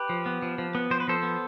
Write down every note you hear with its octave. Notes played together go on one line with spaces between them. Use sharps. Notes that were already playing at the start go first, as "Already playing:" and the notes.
Already playing: G4 B4
F3
B3
F3
F3
B3
F3 C5
B4
F3 A4 C5
B3